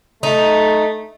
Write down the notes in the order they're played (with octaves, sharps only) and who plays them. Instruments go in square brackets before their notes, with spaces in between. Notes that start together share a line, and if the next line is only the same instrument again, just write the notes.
[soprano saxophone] A3 [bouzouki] D#4